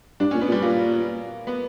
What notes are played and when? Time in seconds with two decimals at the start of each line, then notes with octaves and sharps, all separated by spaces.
0.20 G2 D4
0.31 A#2 C#4
0.41 B3
0.48 A#2
0.52 G3
0.62 A#2 A#3
1.47 B3